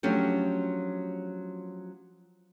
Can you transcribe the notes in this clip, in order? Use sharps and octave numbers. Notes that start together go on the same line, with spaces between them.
F3 F#3 A3 C#4 D4 G4